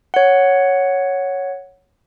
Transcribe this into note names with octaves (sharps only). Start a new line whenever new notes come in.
C#5 F#5